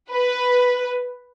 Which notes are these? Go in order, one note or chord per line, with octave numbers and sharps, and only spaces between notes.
B4